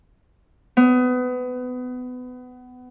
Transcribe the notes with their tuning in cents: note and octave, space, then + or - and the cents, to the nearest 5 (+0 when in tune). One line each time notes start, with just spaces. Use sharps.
B3 +25